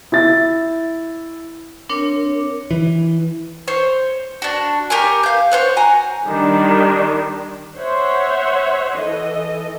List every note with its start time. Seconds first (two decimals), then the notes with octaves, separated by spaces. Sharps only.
0.12 E4 A6
1.89 C4 D4 A#4 C#5
2.71 E3
3.68 C5 C#5
4.42 D4 F#4
4.90 G4 A#4 C#5 G#5
5.23 F5 G6
5.51 C5 C#5 F#5
5.77 F#4 G#5 A#5
6.25 D#3 G3 D4
7.78 C5 C#5 E5 F#5
8.97 E3 A4 D#5